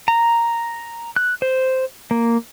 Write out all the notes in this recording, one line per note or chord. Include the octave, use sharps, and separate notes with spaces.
A#5
F#6
C5
A#3